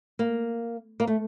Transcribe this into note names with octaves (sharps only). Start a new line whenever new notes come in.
A#3
A#3
A3